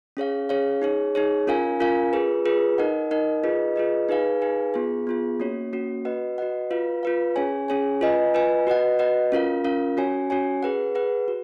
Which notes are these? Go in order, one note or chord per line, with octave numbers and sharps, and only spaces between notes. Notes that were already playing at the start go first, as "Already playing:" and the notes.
C#4 G#4 C#5 F5
C#4 G#4 C#5 F5
D#4 G#4 C#5
D#4 G#4 C#5
C#4 F4 A#4 F5 G#5
C#4 F4 A#4 F5 G#5
F4 G#4 B4
F4 G#4 B4
D#4 A#4 D#5 F#5
D#4 A#4 D#5 F#5
F4 G#4 B4 D#5
F4 G#4 B4 D#5
D#4 G#4 B4 F5 G#5
D#4 G#4 B4 F5 G#5
B3 F4 G#4
B3 F4 G#4
A#3 C#4 F#4 C#5
A#3 C#4 F#4 C#5
F#4 B4 D#5 F#5
F#4 B4 D#5 F#5
F4 B4 F5
F4 B4 F5
C#4 G#4 C#5 G#5
C#4 G#4 C#5 G#5
F4 B4 D#5 G#5
F4 B4 D#5 G#5
F#4 B4 D#5 F#5
F#4 B4 D#5 F#5
C#4 F4 A#4 F5
C#4 F4 A#4 F5
C#4 F#4 C#5 G#5
C#4 F#4 C#5 G#5
G#4 B4 F#5
G#4 B4 F#5
F#4